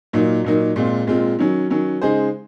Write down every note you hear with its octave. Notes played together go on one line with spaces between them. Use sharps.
A#2 F#3 A#3 D#4
A#2 F#3 A#3 D#4
A#2 G#3 C4 F4
A#2 G#3 C4 F4
D#3 F#3 C#4
D#3 F#3 C#4
C#3 G#3 D#4 G#4 C5